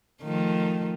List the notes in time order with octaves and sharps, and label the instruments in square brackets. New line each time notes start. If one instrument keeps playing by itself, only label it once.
[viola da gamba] D#3 F3 A3